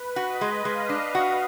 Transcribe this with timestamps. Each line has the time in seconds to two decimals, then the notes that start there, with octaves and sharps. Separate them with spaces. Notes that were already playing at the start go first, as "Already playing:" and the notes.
Already playing: B4
0.16 F#4
0.28 D#5
0.41 G#3
0.65 G#3 F5
0.89 D4
1.15 F#4